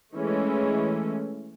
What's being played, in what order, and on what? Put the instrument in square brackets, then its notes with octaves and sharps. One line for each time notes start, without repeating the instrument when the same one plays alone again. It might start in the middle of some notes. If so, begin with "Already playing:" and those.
[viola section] E3 G#3 A3 C#4